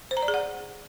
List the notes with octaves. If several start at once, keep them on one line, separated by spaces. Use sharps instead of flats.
C5
A#5
D5
G#4
F#5